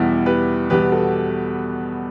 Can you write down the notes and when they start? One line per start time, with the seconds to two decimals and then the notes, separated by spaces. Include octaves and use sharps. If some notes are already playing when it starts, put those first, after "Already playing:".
Already playing: E2 B2 G3 E4 G4
0.26 G4 B4
0.70 E2 B2 G3 G4 B4
0.92 F#4 A4